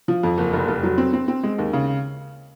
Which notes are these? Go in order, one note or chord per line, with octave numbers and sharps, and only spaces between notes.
F3
F2
F#1
F1
F1
F#3
C4
C4
C4
G#3
D#2
C#3